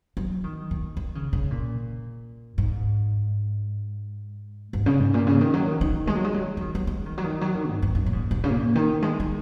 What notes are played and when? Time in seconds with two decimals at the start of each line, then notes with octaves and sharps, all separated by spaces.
0.17 F#3
0.44 D#3
0.71 D#3
0.97 D#3
1.15 C#3
1.33 C#3
1.51 A#2
2.58 G#2
4.73 G#2
4.86 C#3
5.00 G#2
5.14 A#2
5.27 C#3
5.41 D#3
5.54 F#3
5.67 D#3
5.81 D#3
6.07 G#3
6.15 F#3
6.24 G#3
6.34 F#3
6.57 F#3
6.61 D#3
6.75 F#3
6.87 G#3
7.06 D#3
7.18 F#3
7.24 D#3
7.41 F#3
7.55 D#3
7.69 G#2
7.82 G#2
7.95 F#2
8.06 A#2
8.13 G#2
8.31 G#2
8.44 C#3
8.50 A#2
8.75 D#3
9.02 G#3
9.20 G#3